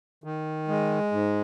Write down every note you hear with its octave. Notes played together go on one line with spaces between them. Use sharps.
D#3
G#3
G#2